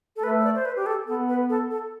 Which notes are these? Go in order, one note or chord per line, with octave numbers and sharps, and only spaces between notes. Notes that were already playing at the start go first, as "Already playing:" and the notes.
A4
A3 B4
C5
D5
C5
B4
G4
A4
B3 A4
B4
A4
A4